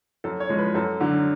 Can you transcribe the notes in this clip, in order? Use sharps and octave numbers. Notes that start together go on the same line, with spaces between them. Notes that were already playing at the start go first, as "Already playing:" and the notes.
F#2 A4
C#5
F3 G#3
B4
F#2 A4
D3 F#3